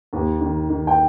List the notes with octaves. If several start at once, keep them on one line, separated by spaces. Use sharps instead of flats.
D#2
D#3
D#3
G5